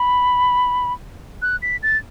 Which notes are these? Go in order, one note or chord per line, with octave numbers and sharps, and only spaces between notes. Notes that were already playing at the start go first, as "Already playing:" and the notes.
Already playing: B5
F#6
B6
A6